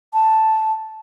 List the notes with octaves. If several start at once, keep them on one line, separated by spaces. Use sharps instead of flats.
A5